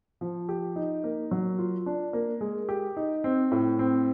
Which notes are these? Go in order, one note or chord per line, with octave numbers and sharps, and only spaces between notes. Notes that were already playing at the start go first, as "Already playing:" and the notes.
F3
G4
D#4
A#3
F#3
F4
D4
A#3
G#3
G4
D#4
C4
A2
C4